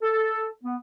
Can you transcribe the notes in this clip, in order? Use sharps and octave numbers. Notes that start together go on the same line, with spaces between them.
A4
B3